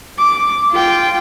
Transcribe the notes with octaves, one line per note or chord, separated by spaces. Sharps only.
D6
F4 G5